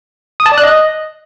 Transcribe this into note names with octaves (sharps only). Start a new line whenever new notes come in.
D#6
A5
D5
F#6
D#5